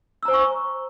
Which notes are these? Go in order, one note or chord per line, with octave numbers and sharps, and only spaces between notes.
C5 G#5 A#5 C#6 E6